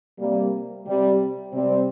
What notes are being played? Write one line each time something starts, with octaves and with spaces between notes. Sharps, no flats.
C3 G3 A#3
C3 G3
C3 G3 C4